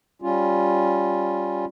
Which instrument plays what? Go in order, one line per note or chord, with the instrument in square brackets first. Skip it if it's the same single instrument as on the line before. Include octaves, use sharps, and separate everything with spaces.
[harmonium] G3 C#4 F4